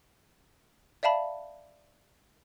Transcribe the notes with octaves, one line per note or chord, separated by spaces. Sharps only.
D5 E5 F5 A5 B5